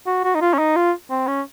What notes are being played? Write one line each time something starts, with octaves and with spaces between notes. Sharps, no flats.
F#4
F#4
D#4
F4
C#4
D#4
F4
C4
C#4